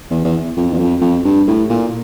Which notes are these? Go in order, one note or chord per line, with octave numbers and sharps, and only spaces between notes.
E2
E2
F2
E2
F2
F2
G2
A2
A#2